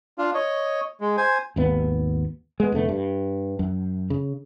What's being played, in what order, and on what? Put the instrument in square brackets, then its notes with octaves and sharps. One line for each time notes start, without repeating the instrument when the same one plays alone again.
[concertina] D4 F4 F5
C#5 D#5
G#3
C5 G#5
[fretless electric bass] G#1 D#2 B3
G#3 B3
F1 D3 A3 B3
G2
F#2
C#3